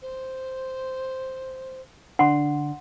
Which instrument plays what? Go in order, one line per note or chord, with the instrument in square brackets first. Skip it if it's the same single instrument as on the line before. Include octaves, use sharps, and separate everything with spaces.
[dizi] C5
[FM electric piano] D3 D4 [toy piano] F#5 C6